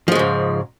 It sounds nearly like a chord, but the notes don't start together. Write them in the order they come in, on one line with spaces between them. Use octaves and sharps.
F3 G#3 C#3 G#2